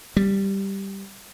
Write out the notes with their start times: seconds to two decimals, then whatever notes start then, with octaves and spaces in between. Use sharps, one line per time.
0.17 G3